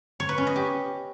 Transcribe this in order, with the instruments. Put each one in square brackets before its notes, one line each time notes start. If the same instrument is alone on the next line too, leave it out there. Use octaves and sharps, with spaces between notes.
[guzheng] C#5
B4
C#4
D#5
G4